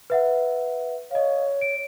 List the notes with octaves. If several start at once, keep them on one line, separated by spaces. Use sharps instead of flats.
B4 E5 F#5
C#5 D#5 F5
D7